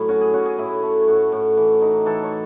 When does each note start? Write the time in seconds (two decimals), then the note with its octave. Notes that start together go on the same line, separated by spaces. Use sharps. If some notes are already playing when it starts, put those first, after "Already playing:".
Already playing: A2 F#3 E4
0.09 C#4 F#4
0.21 G#4
0.34 C#4 F#4
0.46 G#4
0.58 A2 E4
0.83 A3
1.08 A2 F#4
1.32 A2
1.57 E3
1.82 D#4
2.06 E3 A4
2.23 C#5